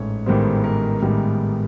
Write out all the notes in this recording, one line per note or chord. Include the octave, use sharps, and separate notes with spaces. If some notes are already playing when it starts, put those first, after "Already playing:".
Already playing: A1 G#2 C#5
A1 G#2 D#3 G3 B3 C5
A#4
A1 G#2 D#3 G3 B3